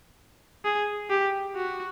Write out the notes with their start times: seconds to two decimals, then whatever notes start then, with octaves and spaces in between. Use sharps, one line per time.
0.64 G#4
1.10 G4
1.55 F#4